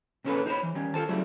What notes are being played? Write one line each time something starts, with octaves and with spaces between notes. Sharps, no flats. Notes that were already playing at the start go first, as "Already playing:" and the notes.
A#2 C#3 C#4 E4 A4 B4
D#4 G#4 C5 C#5 B5
E3
D#3 G3 C#4
F4 A4 C5 A5
C#3 F#3 G3 A3 E4